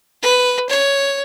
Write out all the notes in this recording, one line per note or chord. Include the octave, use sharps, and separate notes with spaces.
B4
C#5